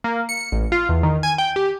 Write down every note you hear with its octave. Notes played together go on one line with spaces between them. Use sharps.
A#3
C#7
A1
F4
E2
D#3
G#5
G5
G4